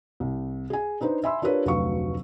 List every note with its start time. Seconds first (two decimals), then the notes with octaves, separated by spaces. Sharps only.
0.20 C2
0.70 G#4 G#5
1.00 D4 D#4 B4 C5
1.24 E5 G#5 B5 C6 E6
1.42 D4 F4 G4 A#4 B4 C#5
1.65 F1 D2 F#3 B4 F5 C#6